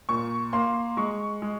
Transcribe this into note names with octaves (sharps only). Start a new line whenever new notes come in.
A#2 C#6
A#3 C6
G#3 C#6
G#3